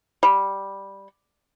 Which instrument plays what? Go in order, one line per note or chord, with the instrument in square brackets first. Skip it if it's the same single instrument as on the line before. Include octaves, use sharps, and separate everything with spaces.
[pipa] G3